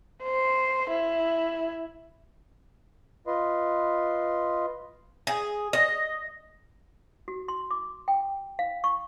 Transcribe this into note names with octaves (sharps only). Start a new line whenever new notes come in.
C5
E4
F4 B4 D#5 C6
G#4
D#5
F#4
C6
D6
G5
F5
C#6